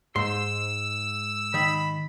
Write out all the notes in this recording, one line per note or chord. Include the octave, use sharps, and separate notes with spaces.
G#2 C5 C6 E6
D#3 B5